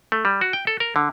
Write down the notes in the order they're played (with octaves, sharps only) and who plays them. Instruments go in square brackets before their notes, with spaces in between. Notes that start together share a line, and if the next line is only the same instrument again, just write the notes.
[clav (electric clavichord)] A3
G3
F#4
G5
A4
A#4
D3